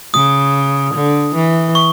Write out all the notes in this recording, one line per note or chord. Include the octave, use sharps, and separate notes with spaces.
C#3 D#6
D3
E3
C#6